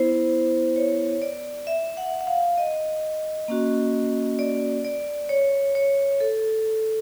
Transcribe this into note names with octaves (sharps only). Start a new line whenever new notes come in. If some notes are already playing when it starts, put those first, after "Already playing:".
Already playing: B3 E4 C5
C#5
D5
E5
F#5
F#5
F5
D#5
A#3 C#4 F#4
D5
D5
C#5
C#5
A4